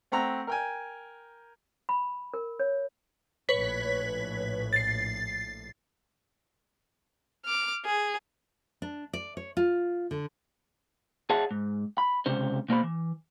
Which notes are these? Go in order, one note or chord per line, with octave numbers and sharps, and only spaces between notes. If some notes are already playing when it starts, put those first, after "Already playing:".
A3 C4 F#5 A#5
A#4 G5 G#5
B5
A#4
C#5
A#1 A2 B4 C#5 B6
A6 C7
D6 F6
G#4
D4
D5
C#5
F4
D3
G#4 C#5 E5 F#5 A5
G#2
B5
C#2 C3 C#4 C5
B2 A#3 C5 B5
E3